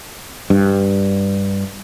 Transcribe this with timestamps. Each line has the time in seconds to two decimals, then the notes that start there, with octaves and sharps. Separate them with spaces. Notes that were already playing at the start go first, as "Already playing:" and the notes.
0.50 G2